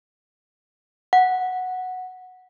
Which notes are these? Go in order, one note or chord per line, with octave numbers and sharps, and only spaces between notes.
F#5